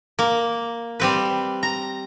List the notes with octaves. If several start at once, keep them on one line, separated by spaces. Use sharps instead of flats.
A#3
G3 C4 B4
A#5